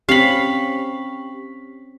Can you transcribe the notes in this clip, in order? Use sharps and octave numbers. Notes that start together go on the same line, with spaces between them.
C4 C#4 G4 F5 B5 B6